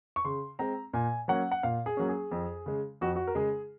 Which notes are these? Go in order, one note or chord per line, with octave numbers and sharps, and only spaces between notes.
C#6
C#3 C6
G#3 C4 A#5
A#2 G#5
F#3 A#3 C#4 F#5
F#5
A#2 F5
G#4
F#3 A#3 C#4
G#4
F2
C#3 G#3
F2 F#4
F#4
A#4
C#3 G#3 G#4